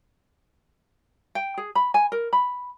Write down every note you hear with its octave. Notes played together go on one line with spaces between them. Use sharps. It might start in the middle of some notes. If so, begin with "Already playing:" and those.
G5
G#4
B5
G#5
A#4
B5